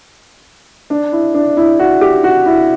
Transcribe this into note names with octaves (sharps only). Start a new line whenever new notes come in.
D4
E4
D4
E4
F#4
G4
F#4
E4